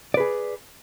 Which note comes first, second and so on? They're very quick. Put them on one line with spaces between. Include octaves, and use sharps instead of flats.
D5 B4 G#4